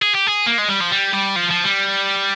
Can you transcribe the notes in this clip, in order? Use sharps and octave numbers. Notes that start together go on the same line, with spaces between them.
G#4
G4
G#4
A#3
G#3
G3
F3
G3
G3
F3
F3
G3